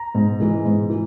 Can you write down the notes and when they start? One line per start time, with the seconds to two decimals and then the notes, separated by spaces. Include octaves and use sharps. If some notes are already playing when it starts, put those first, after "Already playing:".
Already playing: A#5
0.15 G#2
0.40 E3 G#3
0.65 G#2
0.90 E3